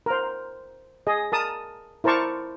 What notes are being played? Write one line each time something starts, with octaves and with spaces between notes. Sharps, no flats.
A#4 C5
G#4 D#5
A#4 A5 D#6
E4 A#4 C5 A5 C#6 D6